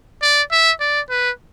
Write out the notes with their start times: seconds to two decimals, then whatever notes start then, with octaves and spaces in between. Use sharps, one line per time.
0.22 D5
0.51 E5
0.80 D5
1.10 B4